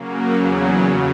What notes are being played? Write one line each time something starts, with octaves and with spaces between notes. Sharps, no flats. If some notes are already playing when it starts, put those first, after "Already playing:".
Already playing: C#3 F#3 A#3
E2 C#3 F#3
F#2 C#3